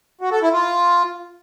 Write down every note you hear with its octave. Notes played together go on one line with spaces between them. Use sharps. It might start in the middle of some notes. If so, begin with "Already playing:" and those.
F#4
A4
E4
F4